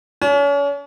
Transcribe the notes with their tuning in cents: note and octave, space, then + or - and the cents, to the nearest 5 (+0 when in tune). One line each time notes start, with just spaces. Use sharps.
C#4 +40